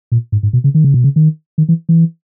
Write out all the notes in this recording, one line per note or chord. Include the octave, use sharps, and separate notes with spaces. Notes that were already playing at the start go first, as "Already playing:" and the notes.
A#2
G#2
G#2
B2
C#3
D#3
C#3
B2
C#3
D#3
D#3
E3
E3